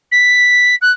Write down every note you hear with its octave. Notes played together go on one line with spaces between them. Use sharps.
B6
F#6